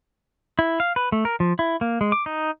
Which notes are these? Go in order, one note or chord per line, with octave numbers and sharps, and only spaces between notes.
E4
F5
B4
A3
A#4
F3
E4
A#3
G#3
D6
D#4